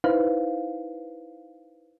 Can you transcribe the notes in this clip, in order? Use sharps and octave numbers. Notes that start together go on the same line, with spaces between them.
D#4 E4 B4 C5 F5